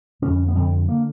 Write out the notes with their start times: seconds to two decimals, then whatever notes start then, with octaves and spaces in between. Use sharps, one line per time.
0.22 F2 D3 C#4
0.48 B3
0.55 F2 D3 C4
0.89 D3 A#3